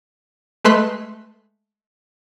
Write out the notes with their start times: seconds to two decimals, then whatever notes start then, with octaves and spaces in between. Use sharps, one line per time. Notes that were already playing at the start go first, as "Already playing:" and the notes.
0.65 G#3 A3 B4 C6 E6 F#6